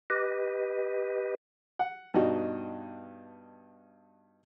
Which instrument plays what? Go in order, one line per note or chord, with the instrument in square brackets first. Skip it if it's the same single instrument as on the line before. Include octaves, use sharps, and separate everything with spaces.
[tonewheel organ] G4 B4 D#5
[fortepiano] F#5
G2 B2 D4 D#4 F#4